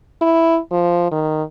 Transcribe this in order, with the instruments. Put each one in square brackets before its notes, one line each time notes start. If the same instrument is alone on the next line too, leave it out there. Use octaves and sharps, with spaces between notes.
[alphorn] E4
F3
D#3